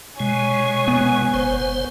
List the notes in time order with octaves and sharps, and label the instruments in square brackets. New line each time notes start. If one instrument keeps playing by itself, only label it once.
[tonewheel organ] B2 G#3 [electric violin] C#5 G#5
[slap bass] B3
[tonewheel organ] F#1 C5